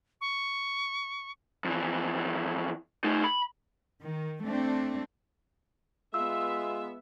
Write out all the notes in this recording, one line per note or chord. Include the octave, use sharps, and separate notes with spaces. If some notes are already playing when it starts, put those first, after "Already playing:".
C#6
F2 E3
A3 D#4
B5
D#3
A3 C4 D4
G#3 B3 F4 E5 E6